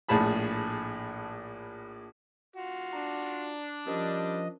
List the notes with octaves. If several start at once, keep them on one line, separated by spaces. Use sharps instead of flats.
A#1 A2 G#4 A5 B5
F4 F#4
D4 A#5
F3 G3 C#4 A#4 C5 D#5